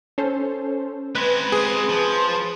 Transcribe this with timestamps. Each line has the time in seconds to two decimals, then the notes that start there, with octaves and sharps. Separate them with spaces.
0.18 C#4 A4 C5
1.15 G#3 C4 B4
1.52 G#4
1.89 F3